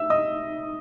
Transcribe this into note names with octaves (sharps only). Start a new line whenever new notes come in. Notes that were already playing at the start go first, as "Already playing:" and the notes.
Already playing: E5 E6
D#5 D#6